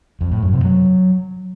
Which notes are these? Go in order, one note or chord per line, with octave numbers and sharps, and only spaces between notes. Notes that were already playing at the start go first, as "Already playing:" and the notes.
F2
A2
F#2
C3
F#3